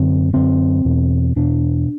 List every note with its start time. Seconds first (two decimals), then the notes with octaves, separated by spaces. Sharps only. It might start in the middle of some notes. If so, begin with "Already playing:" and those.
Already playing: F#2 D3 C4
0.33 F#2 D3 C4
0.85 E2 B2
1.36 E2 B2 D4